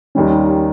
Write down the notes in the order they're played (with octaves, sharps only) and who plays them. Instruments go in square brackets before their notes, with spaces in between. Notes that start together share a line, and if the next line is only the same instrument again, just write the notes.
[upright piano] D#2 D#3 G3 C#4